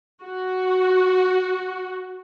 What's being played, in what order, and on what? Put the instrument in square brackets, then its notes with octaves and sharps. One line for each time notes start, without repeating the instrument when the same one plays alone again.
[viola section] F#4